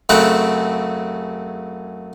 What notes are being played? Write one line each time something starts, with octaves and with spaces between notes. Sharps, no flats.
F#2 C#3 A3 C4 F#5